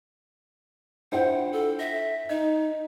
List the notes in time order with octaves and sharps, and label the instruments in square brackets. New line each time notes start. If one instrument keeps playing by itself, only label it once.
[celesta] D4 F4 [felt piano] E4 C5 G5 [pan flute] F#5
[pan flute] A4
[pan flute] E5 [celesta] A#6
[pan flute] D#4 [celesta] D#5